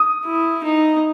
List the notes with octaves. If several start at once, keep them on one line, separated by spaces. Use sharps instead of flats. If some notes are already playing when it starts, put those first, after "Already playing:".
Already playing: D#6
E4
D#4